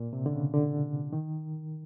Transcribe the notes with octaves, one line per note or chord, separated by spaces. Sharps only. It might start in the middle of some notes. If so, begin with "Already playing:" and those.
Already playing: A#2
C3
D3
C#3
D3
D#3